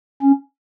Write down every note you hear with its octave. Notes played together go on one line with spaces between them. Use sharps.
C#4